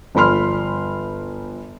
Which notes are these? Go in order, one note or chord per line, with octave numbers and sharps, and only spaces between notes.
G1 F3 B5 C6 F6